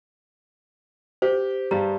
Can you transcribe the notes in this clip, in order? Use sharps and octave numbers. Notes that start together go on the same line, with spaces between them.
G4 C5
G2 G3 A#5